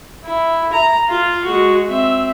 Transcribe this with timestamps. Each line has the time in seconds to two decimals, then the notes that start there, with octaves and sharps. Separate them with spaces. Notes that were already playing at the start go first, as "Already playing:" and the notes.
0.25 E4
0.73 A#5
1.08 F4
1.44 G#3 F#4
1.88 C4 E5